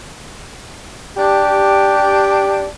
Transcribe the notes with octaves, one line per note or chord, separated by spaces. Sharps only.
D4 G4